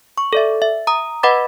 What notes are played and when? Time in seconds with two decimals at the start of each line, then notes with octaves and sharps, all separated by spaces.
0.18 C#6
0.33 A4 D5 E5
0.62 E5
0.87 A#5 D#6
1.23 B4 D#5 F#5 B5 D6 A6